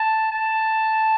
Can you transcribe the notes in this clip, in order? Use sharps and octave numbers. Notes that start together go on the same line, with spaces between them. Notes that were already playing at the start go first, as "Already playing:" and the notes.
Already playing: A5
A5